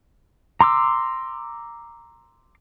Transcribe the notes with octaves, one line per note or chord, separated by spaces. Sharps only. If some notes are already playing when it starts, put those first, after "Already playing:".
A#5 C6 D6 E6